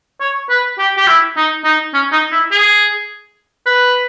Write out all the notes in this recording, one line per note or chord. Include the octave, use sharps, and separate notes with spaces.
C#5
B4
G4
G4
E4
D#4
D#4
C#4
D#4
E4
G#4
B4